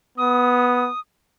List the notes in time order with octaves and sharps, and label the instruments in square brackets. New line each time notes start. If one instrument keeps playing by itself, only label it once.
[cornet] B3 [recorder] D#6